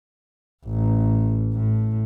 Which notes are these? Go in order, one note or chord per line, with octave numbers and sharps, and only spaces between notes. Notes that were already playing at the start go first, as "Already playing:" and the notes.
A1
A2